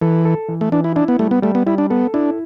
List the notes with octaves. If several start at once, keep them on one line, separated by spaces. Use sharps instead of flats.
E3 A4
A4
E3
A3
E3 D4
E4
D4 E4
B3
G3 A3
B3
G3 A3
B3
G3 E4
D4
B3 A4
D4 E4